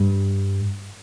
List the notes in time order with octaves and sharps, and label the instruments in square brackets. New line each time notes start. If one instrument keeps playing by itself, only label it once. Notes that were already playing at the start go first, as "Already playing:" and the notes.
Already playing: [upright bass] G2